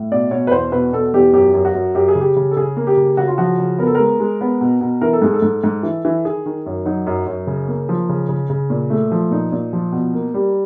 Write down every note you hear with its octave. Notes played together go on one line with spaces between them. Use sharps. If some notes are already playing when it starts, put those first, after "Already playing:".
Already playing: A2
B2 D5
B2 C#5
B4
E2 C5
B2 B4
B2 A4
E2 G4
F#2 G4
F#2
F#4
F#2
F#2 G4
G#4
C#3
G4
C#3
A4
C#3 G#4
A#3
G4
C#3
C#3 F#4
F4
F3 F#4
C#3
B3 A#4
A4
G#3 A#4
G#3
B3
B2
B2
E3 A#4
A4
G#2 G#4
A4
G#2
G#2
E3
E3
D#3 G#4
D#3
F#2
F#3 D#4
F#2
F#2
C#3
A#3
F3
C#3
C#3
C#3
A#2
A3
F3
A#2 D#4
A#2
F3
B2
A#3
G3